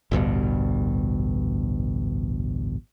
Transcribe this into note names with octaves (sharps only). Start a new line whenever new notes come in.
A1 D2 G2 B2